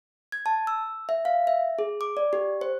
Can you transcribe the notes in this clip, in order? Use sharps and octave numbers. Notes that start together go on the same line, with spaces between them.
G#6
A5
E6
E5
F5
E5
G#4
D6
D5
G4
C5